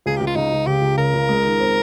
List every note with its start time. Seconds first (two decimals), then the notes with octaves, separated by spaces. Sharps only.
0.06 C#2 G#4
0.16 C#2 G4
0.27 F4
0.36 C#2 D#4
0.52 C#2
0.66 C#3 G4
0.82 C#2
0.97 C#3 A#4
1.14 C#2
1.29 G#3
1.45 D#3
1.60 C4